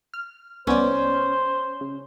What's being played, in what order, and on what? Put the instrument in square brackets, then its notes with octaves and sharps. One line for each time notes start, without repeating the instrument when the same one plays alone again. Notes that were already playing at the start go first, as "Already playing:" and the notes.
[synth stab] F6
[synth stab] C2 B3 D5 [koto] C#4 [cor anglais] C5
[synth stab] C#3